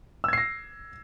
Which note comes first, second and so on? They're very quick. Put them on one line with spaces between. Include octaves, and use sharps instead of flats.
E6 G#6 C7 A#6